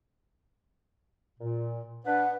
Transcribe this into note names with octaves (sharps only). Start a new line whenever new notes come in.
A#2
D4 B4 F#5